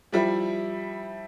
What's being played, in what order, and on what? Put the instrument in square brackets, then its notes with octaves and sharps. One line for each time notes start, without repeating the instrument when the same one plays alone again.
[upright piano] F3 G3 E4